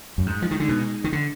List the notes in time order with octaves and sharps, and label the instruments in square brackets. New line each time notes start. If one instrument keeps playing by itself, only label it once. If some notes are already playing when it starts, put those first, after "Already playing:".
[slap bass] F#2
[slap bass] G#2 [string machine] G#3 D#4 G#4
[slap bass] F3
D#3
D3
B2
D#3
D3